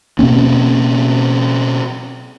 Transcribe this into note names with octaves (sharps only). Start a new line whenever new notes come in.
B2 A#3 C4 C#4